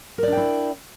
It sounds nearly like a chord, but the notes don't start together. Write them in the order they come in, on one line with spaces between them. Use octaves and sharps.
A#4 D5 D4 G5 E4